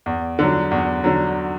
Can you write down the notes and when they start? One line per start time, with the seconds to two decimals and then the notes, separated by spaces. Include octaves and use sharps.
0.06 E2
0.39 D3 F#3
0.71 E2
1.04 D3 F#3